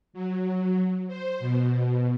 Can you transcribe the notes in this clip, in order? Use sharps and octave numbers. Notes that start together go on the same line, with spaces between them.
F#3
C5
B2